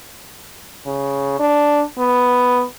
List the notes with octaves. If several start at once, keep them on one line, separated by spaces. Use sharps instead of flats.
C#3
D4
B3